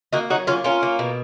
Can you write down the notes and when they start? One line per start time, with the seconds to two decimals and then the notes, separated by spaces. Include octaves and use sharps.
0.13 A#3 D#4 F#4
0.30 F#3 D#4 F#4
0.47 A#3 C#4 F4
0.64 A#3 C#4 F4
0.83 A#3
0.99 B2